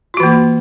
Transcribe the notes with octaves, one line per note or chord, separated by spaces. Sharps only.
E3 A#3 F4 F#4